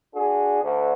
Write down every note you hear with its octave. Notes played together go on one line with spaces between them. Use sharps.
D4 F#4 G#4
D2